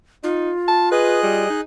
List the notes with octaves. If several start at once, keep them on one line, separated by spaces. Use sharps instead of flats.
D#4 F4
A5
G#4 B4 D#5 F#6
G3
D#4